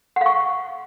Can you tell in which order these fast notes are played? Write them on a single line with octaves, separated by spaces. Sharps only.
F#5 F5 C#6